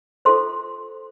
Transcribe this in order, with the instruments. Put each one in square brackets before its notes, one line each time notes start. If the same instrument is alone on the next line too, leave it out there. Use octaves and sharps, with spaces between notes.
[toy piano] F4 A4 C5 C6